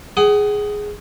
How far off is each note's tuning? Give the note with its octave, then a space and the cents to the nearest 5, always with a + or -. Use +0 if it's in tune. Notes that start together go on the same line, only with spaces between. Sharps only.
G#4 +0 F#5 +40